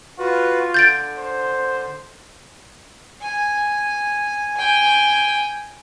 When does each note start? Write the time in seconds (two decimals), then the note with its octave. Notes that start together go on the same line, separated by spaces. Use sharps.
0.19 F4 F#4 B4
0.74 D3 G6 A6 D7
1.18 C5
3.23 G#5
4.56 G5 G#5